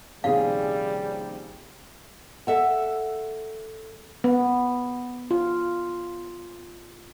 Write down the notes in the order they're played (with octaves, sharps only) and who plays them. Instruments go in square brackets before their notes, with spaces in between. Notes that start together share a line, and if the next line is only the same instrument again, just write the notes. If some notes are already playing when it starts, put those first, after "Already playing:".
[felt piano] A#1 C3 D#3 [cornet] G3 [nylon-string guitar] C#4 F4 G#4 [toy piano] F5
[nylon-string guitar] A4 E5 F#5
[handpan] B3
F4